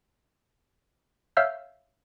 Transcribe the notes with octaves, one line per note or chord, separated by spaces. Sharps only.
C#5 E5 F5 E6 F6 G6